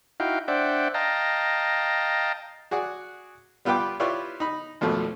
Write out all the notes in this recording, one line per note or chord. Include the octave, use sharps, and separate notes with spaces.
D#4 E4 F#4 F5 G5
D4 C5 D5 E5 F#5 G5
D#5 F5 G5 A5 A#5
F#4 G#4 D5 F#5
G3 B3 F4 B4 G5 D6
E4 F4 G4 B4 C#5 D5
D#4 B5
G#1 F2 B2 A3 A4